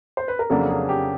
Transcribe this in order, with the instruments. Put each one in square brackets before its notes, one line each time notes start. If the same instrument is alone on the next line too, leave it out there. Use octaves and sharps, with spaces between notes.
[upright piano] C5
B4
A#4
F2 C#3 F#3 A#3 D4 A4
G#4
G4